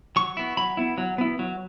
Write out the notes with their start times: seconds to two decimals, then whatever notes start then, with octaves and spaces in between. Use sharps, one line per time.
0.16 F#3 C#6
0.37 B3 E4
0.57 F#3 B5
0.77 B3 E4
0.98 F#3
1.18 B3 E4
1.39 F#3